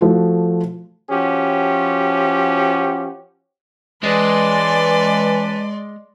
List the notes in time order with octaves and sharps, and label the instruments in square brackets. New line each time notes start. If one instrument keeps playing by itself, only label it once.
[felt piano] F3 A3 F#4
[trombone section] F3 C#4 F#4 G4
[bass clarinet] E3 [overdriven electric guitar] G#3 [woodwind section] C#4 B4 A5 [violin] D5 C6